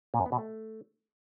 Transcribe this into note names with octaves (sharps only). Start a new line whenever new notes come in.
A#2
F#2
B3
B2
A3